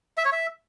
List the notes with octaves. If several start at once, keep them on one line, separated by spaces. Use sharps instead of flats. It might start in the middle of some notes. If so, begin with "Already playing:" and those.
E5
C#5
E5